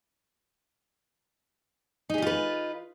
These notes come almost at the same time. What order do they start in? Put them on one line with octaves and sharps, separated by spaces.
D#4 G#4 G4 F4 B4